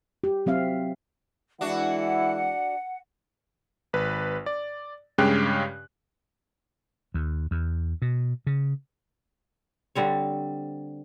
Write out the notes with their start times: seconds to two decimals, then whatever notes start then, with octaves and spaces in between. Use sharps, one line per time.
0.24 G4
0.46 F#3 C4 E5 F5
1.61 E3 G#3 D4 E4 F#4 F#5
3.93 G#1 B4
4.46 D5
5.18 G2 C#3 G#3 G4 G5 F#6
7.14 D#2
7.51 E2
8.02 B2
8.47 C#3
9.95 D3 G3 C4 C#5